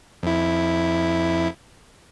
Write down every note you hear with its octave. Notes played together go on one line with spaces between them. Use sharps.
F2 E4